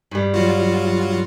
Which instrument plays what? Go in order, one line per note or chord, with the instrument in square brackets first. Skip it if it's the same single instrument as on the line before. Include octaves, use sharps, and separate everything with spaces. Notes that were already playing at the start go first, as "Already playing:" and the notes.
[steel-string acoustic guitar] G2 G3
[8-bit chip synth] F#3 F4 F#4